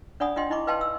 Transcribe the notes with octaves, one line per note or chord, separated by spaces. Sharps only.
D4 D5 F#5 G#5 B5 D#6
D4 F4 D#5 F#5 G5 C6
D#4 E4 D#5 B5 C#6 D6
B4 D#5 F5 G5 A5 C6
E6